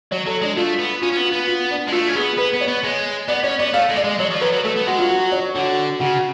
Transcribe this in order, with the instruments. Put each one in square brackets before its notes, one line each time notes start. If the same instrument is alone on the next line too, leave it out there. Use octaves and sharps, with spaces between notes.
[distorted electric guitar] F#3 [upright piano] C#5
[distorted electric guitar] F#3 [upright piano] A4
[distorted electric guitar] G#3 [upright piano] D4
[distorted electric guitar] A3 [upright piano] F4
[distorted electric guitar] B3
[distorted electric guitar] C#4 [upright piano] F4
[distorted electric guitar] C#4
B3
[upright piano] F4
[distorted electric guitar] B3
[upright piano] F4
D4
[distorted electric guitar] G#3
[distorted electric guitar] A3 [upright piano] F4
[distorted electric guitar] C#4
[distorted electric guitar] B3 [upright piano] G#4
[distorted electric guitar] B3 [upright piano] B4
[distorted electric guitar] B3
[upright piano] C#5
[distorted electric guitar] B3
G#3
[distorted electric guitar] B3 [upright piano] D5
[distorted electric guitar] C#4 [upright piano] C#5
[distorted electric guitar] B3 [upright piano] D5
[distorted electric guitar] A3 [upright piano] F5
[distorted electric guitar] G#3
[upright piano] D5
[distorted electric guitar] G#3
[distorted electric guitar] F#3 [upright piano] C#5
[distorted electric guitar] F3
[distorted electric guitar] F#3 [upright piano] B4
[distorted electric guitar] F#3
[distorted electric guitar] A3 [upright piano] A4
[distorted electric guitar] B3
[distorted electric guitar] G#3 [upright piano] F#4
[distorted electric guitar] F#3 [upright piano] F4
[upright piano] F#4
C#5
[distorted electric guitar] D3 [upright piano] F#4
[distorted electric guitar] C#3 [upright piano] F#4